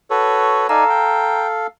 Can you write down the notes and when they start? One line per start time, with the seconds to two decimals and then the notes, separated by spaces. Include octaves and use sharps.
0.10 F#4 A4 B4 C#5
0.69 D#4 A4 D5 F5 G#5 A#5
0.89 G5